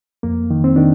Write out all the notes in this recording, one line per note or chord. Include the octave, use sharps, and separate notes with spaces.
F2 A#3
D#3
C4
D#3 D4